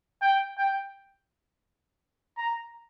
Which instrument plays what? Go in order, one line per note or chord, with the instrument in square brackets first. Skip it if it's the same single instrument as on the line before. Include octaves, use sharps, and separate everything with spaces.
[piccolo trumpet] G5
G5
A#5